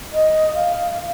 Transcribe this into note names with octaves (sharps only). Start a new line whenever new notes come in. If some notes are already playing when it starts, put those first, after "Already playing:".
D#5
F5